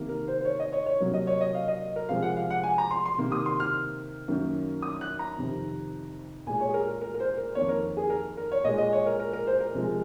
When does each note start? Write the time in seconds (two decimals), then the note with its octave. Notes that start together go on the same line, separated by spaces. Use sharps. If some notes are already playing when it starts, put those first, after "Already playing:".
Already playing: C3 D#3 A#3
0.09 A#4
0.28 C5
0.41 C5
0.45 C#5
0.60 D#5
0.73 C#5
0.86 C#5
1.00 C3 F#3 A#3
1.14 D#5
1.27 C#5
1.41 D#5
1.54 F5
1.68 D#5
1.96 A#4
2.09 C3 F3 G#3 F5
2.22 F#5
2.37 F5
2.50 F#5
2.63 G#5
2.78 A#5
2.91 C6
3.06 C6
3.18 C3 D#3 A#3
3.32 D#6
3.46 C6
3.60 F6
4.28 F#2 D#3 F#3 A#3
4.82 D#6
5.01 F#6
5.19 A#5
5.38 F2 C3 D#3
6.47 A#2 G#3 G#5
6.60 C#5
6.69 G#4
6.74 A#4
6.87 A#4
7.01 A#4
7.15 A#4
7.20 C5
7.38 A#4
7.55 F2 D#3 A#3 C#5
7.69 A#4
7.97 G#4
8.10 A#4
8.37 A#4
8.52 C#5
8.64 A#2 G#3 D#5
8.78 D#5
8.93 C#5
9.06 A#4
9.19 A#4
9.33 A#4
9.47 C5
9.60 A#4
9.75 C3 F3 G#3